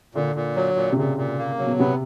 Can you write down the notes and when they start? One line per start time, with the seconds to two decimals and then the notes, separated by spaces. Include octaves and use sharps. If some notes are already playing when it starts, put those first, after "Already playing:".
0.15 A#2 D3
0.36 A#2
0.56 F#3
0.76 A#2
0.92 C3
0.97 A#2 C#3
1.17 A#2
1.38 A#3
1.58 F#3
1.67 B2
1.79 C3 B3